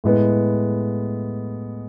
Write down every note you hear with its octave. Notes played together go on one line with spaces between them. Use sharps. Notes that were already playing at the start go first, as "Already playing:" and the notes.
A2 G#3 B3